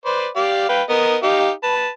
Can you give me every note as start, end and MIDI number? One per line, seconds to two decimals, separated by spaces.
0.06 0.27 71
0.06 0.27 72
0.06 0.27 74
0.36 0.67 67
0.36 0.67 74
0.36 0.67 77
0.69 0.82 71
0.69 0.82 77
0.69 0.82 79
0.89 1.16 59
0.89 1.16 70
0.89 1.16 75
1.23 1.50 63
1.23 1.50 67
1.23 1.50 77
1.63 1.88 71
1.63 1.88 81